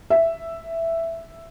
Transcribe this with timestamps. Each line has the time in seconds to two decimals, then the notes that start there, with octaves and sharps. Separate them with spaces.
0.10 E5